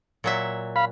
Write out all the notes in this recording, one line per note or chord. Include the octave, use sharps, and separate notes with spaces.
A#2 F#3 E5
F5 B5